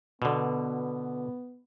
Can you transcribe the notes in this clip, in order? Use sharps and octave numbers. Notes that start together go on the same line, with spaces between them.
B2 D3 B3